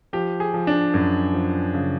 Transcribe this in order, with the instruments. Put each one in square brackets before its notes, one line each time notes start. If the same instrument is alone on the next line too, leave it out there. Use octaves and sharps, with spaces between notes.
[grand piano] F3 G4
G#4
F3
D4
F#2
F3
C#3